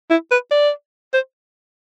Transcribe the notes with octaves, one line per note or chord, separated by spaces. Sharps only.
E4
B4
D5
C5